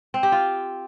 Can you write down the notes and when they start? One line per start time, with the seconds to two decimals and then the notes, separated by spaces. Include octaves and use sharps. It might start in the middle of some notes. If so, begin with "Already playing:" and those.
0.14 C4
0.23 G4
0.32 F4